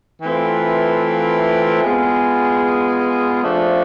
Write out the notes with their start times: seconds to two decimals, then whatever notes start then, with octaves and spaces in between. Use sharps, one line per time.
0.22 E3 A3 C4 F4 B4
1.82 G#3 B3 F4 G#4
3.42 F3 A3 D4